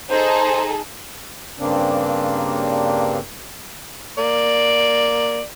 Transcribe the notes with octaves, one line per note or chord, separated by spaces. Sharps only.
D#4 G#4 A4 C5
G2 C#3 A#3 C4 D4
A#3 D5